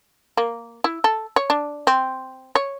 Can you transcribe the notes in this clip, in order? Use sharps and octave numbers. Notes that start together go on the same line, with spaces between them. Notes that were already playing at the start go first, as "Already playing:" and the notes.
A#3
E4
A4
C#5
D4
C4
C#5